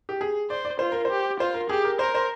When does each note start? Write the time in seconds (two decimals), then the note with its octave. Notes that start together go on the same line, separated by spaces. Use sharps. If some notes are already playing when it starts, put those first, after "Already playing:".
0.09 G4
0.21 G#4
0.50 C5 D5
0.65 D5
0.79 F4 C5
0.92 A#4
1.05 C5
1.10 G4
1.40 F4 C5
1.54 A#4
1.69 G4 G#4
1.85 A#4
1.99 A#4 C5
2.15 C5